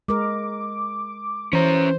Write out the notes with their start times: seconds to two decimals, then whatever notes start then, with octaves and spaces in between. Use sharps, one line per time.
0.08 G#3 A#4 D6
1.53 E3 C#4 C5 A#5